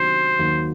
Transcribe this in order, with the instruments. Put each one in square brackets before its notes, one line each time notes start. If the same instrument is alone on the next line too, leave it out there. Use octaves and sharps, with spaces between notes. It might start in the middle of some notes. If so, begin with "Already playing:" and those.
Already playing: [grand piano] C3 D#3 F#3 B3 D4 [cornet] C5
[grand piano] D#2 D#3 F#3 A#3